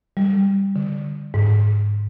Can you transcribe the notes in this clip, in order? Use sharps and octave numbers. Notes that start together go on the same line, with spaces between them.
G3
D3
G#2